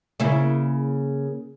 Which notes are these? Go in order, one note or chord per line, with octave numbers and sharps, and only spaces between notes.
C#3 A#3 E4